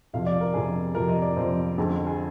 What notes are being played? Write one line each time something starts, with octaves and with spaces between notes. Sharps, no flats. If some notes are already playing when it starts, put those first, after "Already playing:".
F2 C3 F3 F5
D5
A#4
F2 C3 F3 G#4
F2 C3 F3 A#4
D#5
D5
F2 C3 F3 C5
F2 D3 G#3 C4
G#4